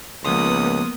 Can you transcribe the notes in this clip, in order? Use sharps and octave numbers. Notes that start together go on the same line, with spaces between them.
C#2 F3 A#3 B3 C6 D#6